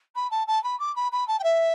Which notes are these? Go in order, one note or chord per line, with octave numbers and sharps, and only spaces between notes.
B5
A5
A5
B5
D6
B5
B5
A5
G5
E5